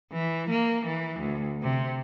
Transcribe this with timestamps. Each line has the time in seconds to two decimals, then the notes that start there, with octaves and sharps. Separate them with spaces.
0.12 E3
0.50 A#3
0.86 E3
1.20 D2
1.62 C3